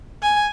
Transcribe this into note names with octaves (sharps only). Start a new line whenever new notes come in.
G#5